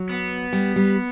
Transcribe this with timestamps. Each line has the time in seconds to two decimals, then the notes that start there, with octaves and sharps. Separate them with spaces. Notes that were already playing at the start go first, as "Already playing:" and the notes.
Already playing: F#3
0.09 B3
0.53 G3
0.76 G3